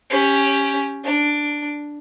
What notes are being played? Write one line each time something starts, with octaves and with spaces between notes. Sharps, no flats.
C#4 G4
D4